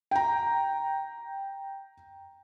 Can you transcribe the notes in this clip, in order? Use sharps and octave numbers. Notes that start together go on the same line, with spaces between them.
G5 A#5